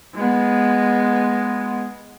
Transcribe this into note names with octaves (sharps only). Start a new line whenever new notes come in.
G#3 B3